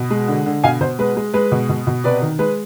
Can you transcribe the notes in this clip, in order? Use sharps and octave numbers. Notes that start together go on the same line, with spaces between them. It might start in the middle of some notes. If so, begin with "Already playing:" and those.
Already playing: B2
G#3
D3
D3
B2 F5 G#5
B2 C5
G#3 B4
G#3
G#3 B4
B2
B2
B2
C3 B4 D5
D#3
G#3 B4